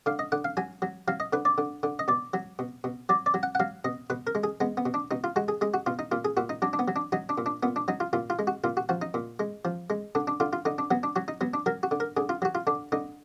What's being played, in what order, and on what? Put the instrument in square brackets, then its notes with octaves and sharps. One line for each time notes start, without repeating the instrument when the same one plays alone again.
[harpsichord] D3 F5
D#5
D3 F#5
F5
F#3 G#5
F#3
F#3 F5
D#5
D3 B4
D5
D3
D3
D#5
B2 D5
F#3
B2
B2
F#3 D5
D5
F#3
F#5
F#5
F#3 F5
B2 D#5
B2 B4
A#4
G#3
G#4
G#3 B3
B3
B2
D4
B2 D#4
F4
G#3 F#4
G#4
G#3 G#4
F#4
B2 F4
D#4
A#2 F4
G#4
A#2 F#4
D#4
F#3 D4
D4
B3
F#3
D4
F#3 D#4
D4
A#2
D4
A#2 B3
D4
F#3 D#4
F4
A#2 F4
F4
G#3
F#4
A#2 F4
F#4
F3 F#4
D#4
A#2
G#3
F3
G#3
D3 D4
D4
D3 F4
F4
D3 D#4
D4
F#3 B3
D4
F#3 F#4
D#4
F#3 B3
D4
F#3 A#4
F#4
D3
A#4
D3 G#4
F4
F#3 F#4
F4
D3 D4
D3 D#4